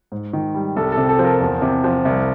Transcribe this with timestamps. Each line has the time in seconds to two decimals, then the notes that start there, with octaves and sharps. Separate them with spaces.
0.12 G#2
0.33 D#3
0.55 G3
0.76 C2 A4
0.92 A4
0.97 C3
1.09 A4
1.19 F3
1.25 A#4
1.41 E2
1.62 C3
1.84 F3
2.05 C2